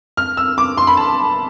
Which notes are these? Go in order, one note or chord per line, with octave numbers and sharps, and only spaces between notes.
F6
E6
D6
C6
B5
A5